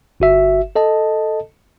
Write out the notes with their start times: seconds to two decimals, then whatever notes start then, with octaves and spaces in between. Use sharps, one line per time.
0.20 G1 F#4 E5
0.76 A4 D#5 A5